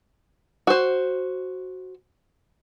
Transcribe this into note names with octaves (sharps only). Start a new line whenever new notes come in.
F#4 C5